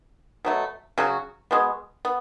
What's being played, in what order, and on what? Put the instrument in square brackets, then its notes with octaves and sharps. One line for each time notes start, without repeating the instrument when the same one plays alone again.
[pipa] B2 F#3 A3
C#3 F#3 C#4 F#4
B2 G#3 B3
B3